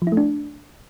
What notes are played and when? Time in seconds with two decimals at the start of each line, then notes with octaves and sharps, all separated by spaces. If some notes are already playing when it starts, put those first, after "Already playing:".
0.02 F3
0.07 E4
0.12 A3
0.17 D4